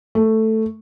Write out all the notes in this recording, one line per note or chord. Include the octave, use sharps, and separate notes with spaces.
A3